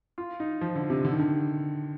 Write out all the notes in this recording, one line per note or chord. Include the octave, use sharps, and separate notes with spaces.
F4
D#4
F3
D3
C3
D3
D#3
D3